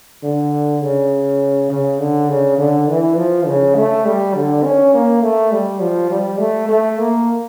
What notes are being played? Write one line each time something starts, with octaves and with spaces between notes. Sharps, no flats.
D3
C#3
C#3
D3
C#3
D3
E3
F3
C#3
A3
G3
D3
C#4
A#3
A3
G3
F3
G3
A3
A3
A#3